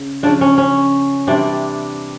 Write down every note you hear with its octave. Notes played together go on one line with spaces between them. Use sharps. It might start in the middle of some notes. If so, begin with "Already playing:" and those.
Already playing: C#3
C#3 F3 D4
C#4
C#4
C3 E3 G3 D4